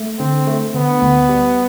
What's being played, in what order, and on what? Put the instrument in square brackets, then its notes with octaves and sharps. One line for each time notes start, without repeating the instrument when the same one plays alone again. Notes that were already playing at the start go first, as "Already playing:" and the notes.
Already playing: [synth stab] A3
[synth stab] D3 [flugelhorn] C4
[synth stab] A3
[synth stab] D3 [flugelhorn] B3
[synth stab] D2
G3